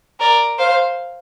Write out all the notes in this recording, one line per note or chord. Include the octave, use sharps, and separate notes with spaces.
A#4 D5
C5 F5